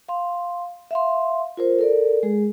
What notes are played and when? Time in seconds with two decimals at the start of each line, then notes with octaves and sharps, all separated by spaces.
0.09 F5 C6
0.91 E5 F5 C6
1.57 F4 A#4 C5
1.79 A4 A#4 D5
2.23 G#3 G#4